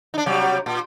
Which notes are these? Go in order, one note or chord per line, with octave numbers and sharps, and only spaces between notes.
D4 D#4
C3 F#3 G3
A#2